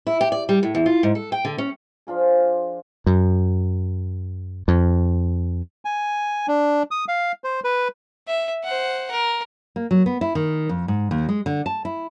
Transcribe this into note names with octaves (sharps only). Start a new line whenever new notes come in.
E4
G4
D5
G3
A2
E2
F4
G#2
A4
G5
D3
C#4
F3 D4 F4 G#4
F#2
F2
G#5
D4
D#6
F5
C5
B4
E5
C5 F#5
A#4
A#3
F#3
B3
E4
D#3
F2
G#2
D#2
G#3
D3
A5
E4